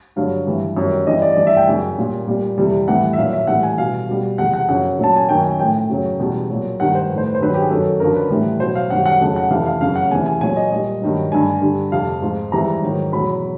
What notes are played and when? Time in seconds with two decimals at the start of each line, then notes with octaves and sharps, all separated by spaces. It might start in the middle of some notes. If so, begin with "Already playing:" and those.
0.16 G2 D3 F#3 F5
0.47 G2 E3 G3
0.77 F#2 D#3 G3
1.07 G2 E3 G3 D#5
1.22 D5
1.37 G2 E3 G3 D5
1.47 E5
1.57 G5
1.67 F#2 C#3 F#3 G#5
1.97 A#2 G3
2.28 A#2 G3
2.58 F2 C3 E3 G3
2.88 A2 E3 G3 F#5
3.13 E5
3.18 A#2 F#3 F5
3.33 E5
3.47 A2 E3 G3 F#5
3.63 G#5
3.78 B2 G3 F5
4.09 B2 G3
4.38 E2 C3 F3 F#5
4.54 F#5
4.69 F#2 C#3 F3 F#5
4.99 A#2 F#3 A5
5.17 G#5
5.29 F#2 D#3 F#3 G5
5.44 G#5
5.59 A2 F3 G5
5.89 F#2 C#3 F#3
6.19 E2 B2 G3
6.49 A#2 F#3
6.79 G2 D#3 G3 F#5
6.95 C5
7.10 A2 F3 B4
7.18 C5
7.27 B4
7.35 C5
7.40 G2 D#3 F#3 B4
7.54 G4
7.62 G#4
7.70 F#2 D#3 F#3 A4
8.00 F#2 D3 F3 A#4
8.15 B4
8.30 A2 E3 G3
8.60 B2 F#3 C5
8.75 F5
8.90 F#2 D#3 G3 F#5
9.06 F#5
9.21 F2 C#3 F#3
9.36 F#5
9.51 F2 C3 E3 F5
9.66 F5
9.81 F#2 C#3 F#3 F5
9.96 F#5
10.11 E2 C3 E3 G#5
10.26 G#5
10.41 A#2 F#3 G#5
10.56 D#5
10.72 A#2 G3 D#5
11.02 G2 D#3 F#3
11.31 G2 D3 G3 G#5
11.62 G2 D3 G3
11.92 F2 C3 F3 F5
12.22 G#2 F3
12.52 G#2 E3 G3 A#5
12.83 G#2 D#3 F#3
13.13 E2 B2 F#3 B5